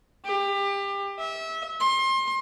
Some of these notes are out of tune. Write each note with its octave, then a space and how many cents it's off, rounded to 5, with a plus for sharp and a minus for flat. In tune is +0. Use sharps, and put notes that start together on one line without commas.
G4 +25
E5 -25
C6 +30